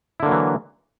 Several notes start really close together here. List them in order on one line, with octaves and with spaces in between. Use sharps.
E4 D3 A#3 F#3 E3